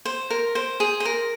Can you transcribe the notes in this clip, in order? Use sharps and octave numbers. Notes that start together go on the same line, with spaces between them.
C5
A#4
C5
G#4
C5
A#4